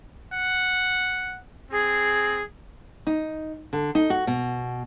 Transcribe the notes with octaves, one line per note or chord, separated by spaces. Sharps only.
F#5
C4 G#4
D#4
D3
D#4
F#4
B2